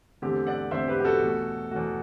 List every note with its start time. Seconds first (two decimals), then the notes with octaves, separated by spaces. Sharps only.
0.22 E2 D3 A3 C4 G4
0.47 D5 F#5
0.71 E2 D3 A3 C4 C5 E5
0.88 G4 B4
1.00 G4
1.04 F#4 A4
1.21 E2 B2 A3
1.71 E2 B2 A3 F#4